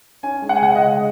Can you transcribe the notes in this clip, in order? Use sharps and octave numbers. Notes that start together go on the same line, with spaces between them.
C#4 G#5
G#3
F#5
G#5
C#3 F#5
D#5
G#3